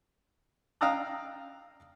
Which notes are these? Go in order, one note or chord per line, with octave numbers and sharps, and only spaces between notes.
F5 G5 A#5 D#6 E6 F#6